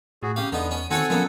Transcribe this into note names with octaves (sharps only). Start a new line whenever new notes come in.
A2 F#4 G#4
C#3 G4 F5
E2 D3 B3 D#4
C#4
D#3 C4 F#4 A4 C#5 F#5 G#5
F#2 A#2 F3 B3